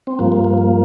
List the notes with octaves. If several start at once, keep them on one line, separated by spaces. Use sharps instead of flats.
C4
G2 F3 A#3
A#3
A#3
A#3